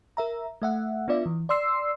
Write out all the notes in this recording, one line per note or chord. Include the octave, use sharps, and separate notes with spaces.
A#4 E5 A#5
A3 E5 F#5
B3 D4 F4 D5 E5
E3
D5 C6 E6 C7